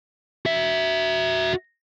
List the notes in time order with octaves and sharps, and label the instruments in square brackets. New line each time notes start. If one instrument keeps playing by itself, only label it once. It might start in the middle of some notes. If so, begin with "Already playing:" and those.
[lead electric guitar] F#4 E5